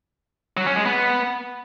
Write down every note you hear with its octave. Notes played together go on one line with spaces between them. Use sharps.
F#3
C#4
G#3
B3